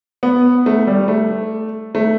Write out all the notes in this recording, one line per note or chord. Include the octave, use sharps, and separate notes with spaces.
B3
A3
G3
A3
A3